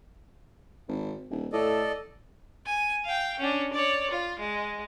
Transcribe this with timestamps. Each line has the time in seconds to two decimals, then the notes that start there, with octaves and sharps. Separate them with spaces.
0.88 G#1
1.30 D#1
1.53 A2 A4 D5 D#5
2.66 G#5
3.05 F5 G5
3.39 C#4 D4
3.73 C#5 D5
4.11 F4
4.39 G#3